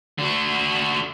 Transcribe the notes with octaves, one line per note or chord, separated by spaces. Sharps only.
D3 F#4